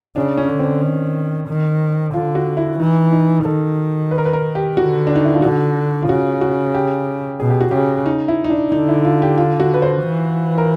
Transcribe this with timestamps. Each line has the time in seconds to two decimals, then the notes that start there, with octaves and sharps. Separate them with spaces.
0.16 C#3 D4
0.37 C#4
0.49 D3
0.60 C4
0.81 D#3
1.48 D#3
2.14 D3 F4
2.35 F#4
2.57 E4
2.79 E3 D#4
3.12 D#4
3.45 D#3 A4
4.11 B4
4.18 A#4
4.25 B4
4.33 A#4
4.55 G4
4.76 D3 F#4
5.07 D4
5.16 D#4
5.25 E4
5.34 F4
5.42 D3 F#4
6.03 F4
6.08 C#3 F#4
6.41 F#4
6.75 G4
7.40 B2 G#4
7.50 G4
7.61 F#4
7.71 C#3 G4
8.06 D#4
8.28 E4
8.44 D#4
8.50 D4
8.72 D3 D#4
8.89 E4
9.05 F4
9.22 G4
9.38 F4
9.60 F#4
9.74 B4
9.82 C5
10.03 E3
10.58 A#4